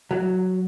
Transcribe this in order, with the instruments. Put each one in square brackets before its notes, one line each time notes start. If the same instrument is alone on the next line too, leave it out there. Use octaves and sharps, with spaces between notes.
[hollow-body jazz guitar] F#3